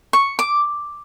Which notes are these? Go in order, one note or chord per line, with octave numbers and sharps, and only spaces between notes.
C#6
D6